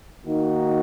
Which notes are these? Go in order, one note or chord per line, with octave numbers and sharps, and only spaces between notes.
D#3 A#3 D#4 F#4